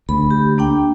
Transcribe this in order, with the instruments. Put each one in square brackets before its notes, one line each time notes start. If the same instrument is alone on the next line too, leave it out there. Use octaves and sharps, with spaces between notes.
[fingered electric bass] D2 [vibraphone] B5
[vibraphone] G4
A#3 D4 G5